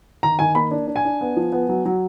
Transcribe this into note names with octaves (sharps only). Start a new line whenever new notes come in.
D#3 A#5
D#3 G#5
A#3 B5
D4
D4
G#5
D4
B3
F3
B3
F#3
F#3